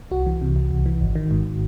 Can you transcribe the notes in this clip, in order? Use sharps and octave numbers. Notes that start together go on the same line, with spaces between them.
C2 F#4
E3
C3
C2
C2
E3
G#1
D#3
G#2